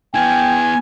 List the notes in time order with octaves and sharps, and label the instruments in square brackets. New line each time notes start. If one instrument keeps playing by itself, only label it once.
[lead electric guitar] B3 E4 [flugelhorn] G5 [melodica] G#5